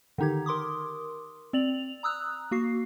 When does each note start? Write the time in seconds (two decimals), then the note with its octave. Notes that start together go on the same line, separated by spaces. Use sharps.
0.18 D3 D#3 D#4 G4 G#6
0.46 A#4 C6 D6 D#6
1.53 C4 D5 F7 F#7
2.03 A#5 D#6 E6 F#6
2.51 A#3 F#4 C7